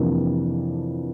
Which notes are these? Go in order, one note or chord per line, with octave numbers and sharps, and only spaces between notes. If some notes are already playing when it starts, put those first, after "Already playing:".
Already playing: F2 C3 E3 A#3 D4